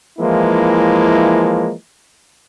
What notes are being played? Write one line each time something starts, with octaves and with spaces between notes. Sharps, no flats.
E3 F3 G#3 A#3 E4